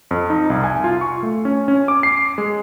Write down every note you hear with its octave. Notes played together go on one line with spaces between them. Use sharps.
F2
D#4
C2
G#5
F4
C#6
A3
C#4
C#4
D6
C7
G#3